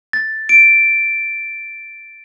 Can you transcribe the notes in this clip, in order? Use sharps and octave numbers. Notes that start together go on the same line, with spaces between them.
A6
D7